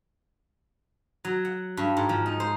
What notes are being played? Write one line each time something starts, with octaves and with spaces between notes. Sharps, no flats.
F#3
F#5
G2
G#2
F3
D#4
C5